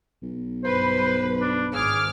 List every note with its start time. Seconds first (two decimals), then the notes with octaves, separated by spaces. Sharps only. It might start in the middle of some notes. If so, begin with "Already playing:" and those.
0.22 B1
0.64 G2 B4 C5
1.41 D4
1.74 G#1 G#4 D6 F6